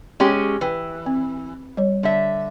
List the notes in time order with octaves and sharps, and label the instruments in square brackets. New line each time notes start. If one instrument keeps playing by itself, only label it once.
[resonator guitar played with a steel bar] G#3 C#4 G4
[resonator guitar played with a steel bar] E3 [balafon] B4 G5
[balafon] C4
G3 C#5
[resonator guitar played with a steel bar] D3 E5